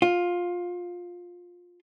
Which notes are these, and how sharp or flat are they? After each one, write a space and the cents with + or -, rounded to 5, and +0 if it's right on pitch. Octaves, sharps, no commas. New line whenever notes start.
F4 +15